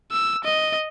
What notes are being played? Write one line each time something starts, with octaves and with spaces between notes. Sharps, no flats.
E6
D#5